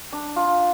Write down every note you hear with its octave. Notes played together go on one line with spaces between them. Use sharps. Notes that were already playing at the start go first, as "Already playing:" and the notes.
D4
F4